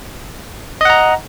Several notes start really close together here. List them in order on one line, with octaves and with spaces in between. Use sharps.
D#5 F#5 A#5